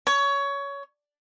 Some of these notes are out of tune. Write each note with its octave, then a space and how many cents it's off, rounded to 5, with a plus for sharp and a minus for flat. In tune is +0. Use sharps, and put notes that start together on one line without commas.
C#5 +20